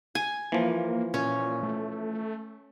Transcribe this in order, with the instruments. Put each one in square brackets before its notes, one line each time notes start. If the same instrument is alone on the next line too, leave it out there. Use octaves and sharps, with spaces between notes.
[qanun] G#5
[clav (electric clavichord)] E3 F3 [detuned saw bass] A#3
[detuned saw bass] A#2 [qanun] C#4
[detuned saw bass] A3